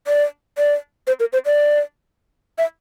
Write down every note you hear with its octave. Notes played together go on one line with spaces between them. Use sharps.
D5
D5
C5
A#4
C5
D5
E5